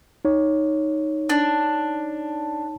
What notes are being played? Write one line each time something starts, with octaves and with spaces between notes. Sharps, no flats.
D#4 C#5
D4